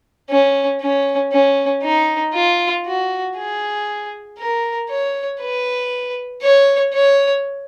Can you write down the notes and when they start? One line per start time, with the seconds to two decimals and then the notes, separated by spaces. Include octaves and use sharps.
0.30 C#4
0.81 C#4
1.32 C#4
1.83 D#4
2.34 F4
2.86 F#4
3.37 G#4
4.39 A#4
4.89 C#5
5.40 B4
6.42 C#5
6.94 C#5